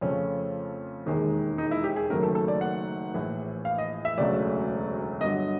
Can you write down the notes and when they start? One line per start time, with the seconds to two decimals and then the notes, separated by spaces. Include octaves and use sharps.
0.01 F2 C#3 F3 A3 C#4
1.06 E1 D#2 D#3 G#3
1.58 D#4
1.71 E4
1.84 G4
1.96 G#4
2.10 F#1 F#2 D#3 F#3 A3 A#4
2.23 A4
2.35 A4
2.48 D5
2.61 F#5
3.14 A#1 A2 E3
3.65 F5
3.78 D#5
4.05 E5
4.17 E1 D2 C#3 F#3 A3 D5
5.21 G1 G2 D3 F#3 D#5